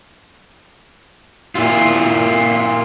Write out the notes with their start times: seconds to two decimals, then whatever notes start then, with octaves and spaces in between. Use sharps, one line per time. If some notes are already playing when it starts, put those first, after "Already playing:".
1.55 A#2 E4 F4